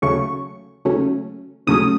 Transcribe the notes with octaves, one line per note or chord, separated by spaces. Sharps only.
D#2 C#3 F#3 A3 C#4 C#6
D#2 C#3 F#3 A3 C#4
D#2 C#3 F#3 A3 C#4 D#6